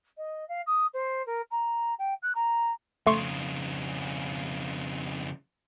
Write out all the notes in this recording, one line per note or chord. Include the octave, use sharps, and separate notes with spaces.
D#5
F5
D#6
C5
A#4
A#5
G5
F#6
A#5
F2 C#3 A3 C6 C#6